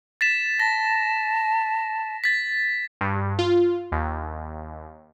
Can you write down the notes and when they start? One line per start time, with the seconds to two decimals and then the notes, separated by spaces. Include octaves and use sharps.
0.21 A6 B6 E7
0.60 A5 A#6
2.24 A6 B6
3.01 G2
3.39 F4
3.92 D#2